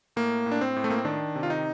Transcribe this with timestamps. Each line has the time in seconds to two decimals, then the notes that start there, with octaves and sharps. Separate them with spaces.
0.16 A2 A#3
0.46 A2
0.51 D4
0.61 C4
0.76 A2
0.84 A3
0.90 A#3
0.98 C4
1.05 D#3 D4
1.36 C3
1.43 F4
1.50 D#4